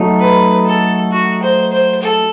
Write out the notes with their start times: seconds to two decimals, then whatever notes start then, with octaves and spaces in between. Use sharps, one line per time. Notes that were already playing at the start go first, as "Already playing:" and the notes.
Already playing: F#3 A3 D#4
0.20 B4
0.66 A4
1.12 F#4
1.42 C5
1.72 C5
2.02 A4